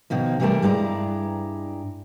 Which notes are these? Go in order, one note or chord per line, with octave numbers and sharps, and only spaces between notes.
B2 D#3 F3 A#3
C3 E3 G3 A3 A#4 A5
G2 G#3 E4 D5 A5 A#5